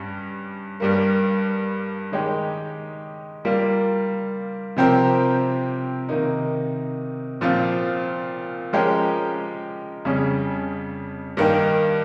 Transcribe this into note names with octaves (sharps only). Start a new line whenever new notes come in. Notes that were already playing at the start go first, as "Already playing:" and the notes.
Already playing: G2 G3 C#4
G2 G3 A#3
D#3 G#3 D#4 G4
G3 A#3 F4 A#4
C3 F3 C4 G4 A#4
C3 D#3 A#3 D#4
A#2 F3 C4 F4
F3 G#3 C#4 G4 A#4
F2 C#3 G3 C#4 G#4
G2 D#3 A#3 D#4 G4